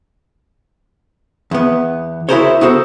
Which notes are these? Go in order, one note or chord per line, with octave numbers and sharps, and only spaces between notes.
E2 B3
E4 F#4 G#4 A#4 C5 C#5
B3 D#4 F#4 A4 C5